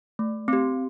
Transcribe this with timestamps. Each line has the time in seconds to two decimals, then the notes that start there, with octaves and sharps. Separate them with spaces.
0.19 A3
0.48 C4 G4